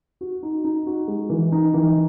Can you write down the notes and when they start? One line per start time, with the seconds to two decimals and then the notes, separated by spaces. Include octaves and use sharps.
0.21 F#4
0.43 D#4
0.64 D#4
0.87 F#4
1.08 G#3
1.30 E3
1.52 D#4
1.74 E3